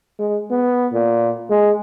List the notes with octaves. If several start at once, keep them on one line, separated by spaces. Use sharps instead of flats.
G#3
B3
A#2
G#3